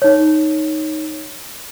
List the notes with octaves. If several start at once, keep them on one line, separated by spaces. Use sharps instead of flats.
D#4 C#5